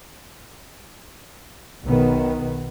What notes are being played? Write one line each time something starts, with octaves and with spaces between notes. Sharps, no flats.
B1 D#3 B3